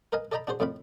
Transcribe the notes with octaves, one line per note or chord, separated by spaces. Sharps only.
A#4 B4 D#5 F5 G#5
A4 D5 D#5 G5 A#5 B5
D4 F#4 G#4 C5
F2 A2 C4 F5 B5